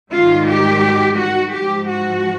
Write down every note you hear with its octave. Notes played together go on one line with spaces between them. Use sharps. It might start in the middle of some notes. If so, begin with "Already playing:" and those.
G#2 D#3 G3 F4
G4
F#4
G#2 F3 G4
F#4